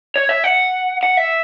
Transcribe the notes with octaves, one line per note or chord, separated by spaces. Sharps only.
C#5
E5
F#5
F#5
E5